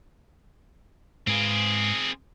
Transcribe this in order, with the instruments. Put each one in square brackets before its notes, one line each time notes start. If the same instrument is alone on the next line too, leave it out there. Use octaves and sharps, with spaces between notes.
[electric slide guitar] G#2 B4 F5 [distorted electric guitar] C4 G#4